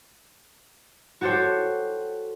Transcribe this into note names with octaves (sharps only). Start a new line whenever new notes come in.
F#4 G4 A4 C5 C#5